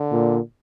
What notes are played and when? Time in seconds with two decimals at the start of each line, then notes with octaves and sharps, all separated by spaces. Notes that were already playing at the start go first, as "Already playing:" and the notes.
Already playing: D3
0.12 A#2